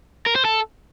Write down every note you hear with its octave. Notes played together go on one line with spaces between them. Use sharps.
A#4
C5
A4